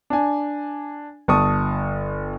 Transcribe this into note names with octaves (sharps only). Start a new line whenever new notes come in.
D4 G#5
G1 A5 C#6 D#6